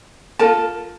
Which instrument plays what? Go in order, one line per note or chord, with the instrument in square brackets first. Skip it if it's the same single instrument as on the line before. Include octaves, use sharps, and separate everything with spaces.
[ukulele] F4 A4 A#4 A5